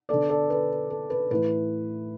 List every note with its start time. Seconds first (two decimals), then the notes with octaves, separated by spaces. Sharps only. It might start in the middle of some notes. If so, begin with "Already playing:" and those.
0.09 D3 B3 A4 D5
0.29 A4 D5
0.50 B4
0.90 A4
1.10 B4
1.31 A2 E3 A3 B4